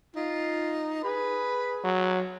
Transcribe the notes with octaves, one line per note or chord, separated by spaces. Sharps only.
D#4 F4
G#4 B4 B5
F#3